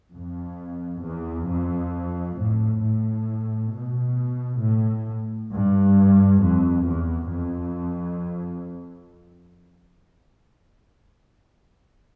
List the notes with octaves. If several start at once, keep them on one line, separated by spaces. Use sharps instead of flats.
F2
E2
F2
A2
A2
B2
A2
G2
F2
E2
F2